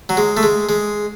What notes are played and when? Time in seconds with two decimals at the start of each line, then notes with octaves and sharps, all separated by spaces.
0.09 F#3
0.17 G#3
0.37 A3
0.43 G#3
0.69 G#3